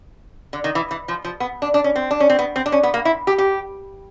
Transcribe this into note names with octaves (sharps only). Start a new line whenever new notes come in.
D3
D#3
E3
E3
F3
F3
B3
D4
D4
C#4
C4
D4
C#4
C4
B3
C4
D4
C#4
B3
A#3
E4
G4
G4